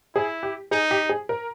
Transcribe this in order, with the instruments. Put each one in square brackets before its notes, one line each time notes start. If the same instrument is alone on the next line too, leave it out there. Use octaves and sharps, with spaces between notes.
[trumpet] E4 [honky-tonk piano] G#4
[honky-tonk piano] G4
[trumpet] D#4 [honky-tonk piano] G#4
[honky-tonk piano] G4
G#4
A#4